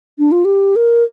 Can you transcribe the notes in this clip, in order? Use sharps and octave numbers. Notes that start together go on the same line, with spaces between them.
D4
F4
G4
A#4